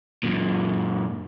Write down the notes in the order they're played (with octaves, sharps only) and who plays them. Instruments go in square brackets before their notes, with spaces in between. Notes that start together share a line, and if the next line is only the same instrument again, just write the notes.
[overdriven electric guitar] F#2 A#2